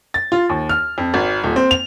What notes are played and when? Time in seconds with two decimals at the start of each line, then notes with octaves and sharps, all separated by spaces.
0.14 A6
0.32 F4
0.50 D#2
0.69 F6
0.98 F2
1.14 G#1
1.43 D#1
1.56 C4
1.71 F7